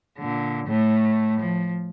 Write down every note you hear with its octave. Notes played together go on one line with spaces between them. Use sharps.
A#2 D3
A2 A3
F3